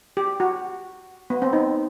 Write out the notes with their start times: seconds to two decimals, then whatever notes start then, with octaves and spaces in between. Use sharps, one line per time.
0.17 G4
0.40 F#4
1.30 B3
1.42 C4
1.53 D#4